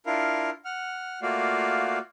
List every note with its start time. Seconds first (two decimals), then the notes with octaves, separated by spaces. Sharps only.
0.06 D4 E4 F4 A#4 F5
0.65 F#5 F6
1.22 A3 A#3 F4 F#4 D5 F5